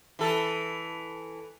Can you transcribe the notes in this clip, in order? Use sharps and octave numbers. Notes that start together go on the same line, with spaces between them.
E3 A4